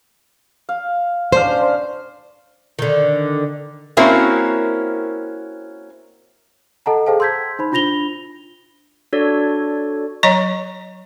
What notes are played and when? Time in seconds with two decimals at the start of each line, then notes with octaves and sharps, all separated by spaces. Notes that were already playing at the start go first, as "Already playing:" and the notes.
0.69 F5
1.32 C#4 D4 C5 F5
2.79 D3 D#3
3.97 A#3 C4 C#4 E4 F#4 A#4
6.86 A4 D#5 F#5 A5 A#5
7.06 G#4 A4 C5 F5 G5 A5
7.20 C6 E6 G6 G#6 B6
7.59 D#4 C5 B5
7.72 D4 F4 B5 A#6 F7 G7
9.13 D4 F#4 A4 C#5 D5
10.23 F#3 C#5 D#5 A#5 C#6